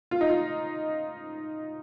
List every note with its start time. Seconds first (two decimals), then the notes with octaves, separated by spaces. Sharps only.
0.11 F4
0.21 D#4
0.30 F4